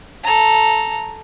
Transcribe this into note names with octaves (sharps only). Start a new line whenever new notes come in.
A4 A#5